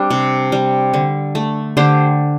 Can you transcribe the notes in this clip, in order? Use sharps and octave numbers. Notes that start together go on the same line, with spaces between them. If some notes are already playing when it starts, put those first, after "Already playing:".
Already playing: G3 C4 D4
C3
G3
D3
A3
D3 G4 C5